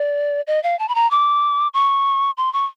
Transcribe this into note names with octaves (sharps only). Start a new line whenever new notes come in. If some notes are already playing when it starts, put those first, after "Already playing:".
Already playing: D5
D#5
F5
A5
B5
A#5
D6
C#6
C6
C#6